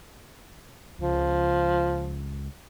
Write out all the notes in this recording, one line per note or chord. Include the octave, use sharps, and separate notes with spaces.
C#2 F3